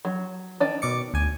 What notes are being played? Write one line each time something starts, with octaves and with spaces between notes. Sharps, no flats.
F#3
D#3 D5 A5
B2 D6 C#7
D2 G#5